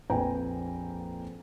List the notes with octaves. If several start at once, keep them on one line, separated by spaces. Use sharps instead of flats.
A#1 F2 B4 G5 G#5 A#5